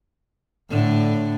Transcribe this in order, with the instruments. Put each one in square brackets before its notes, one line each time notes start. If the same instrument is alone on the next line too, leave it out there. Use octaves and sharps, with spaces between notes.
[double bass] A2 [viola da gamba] D3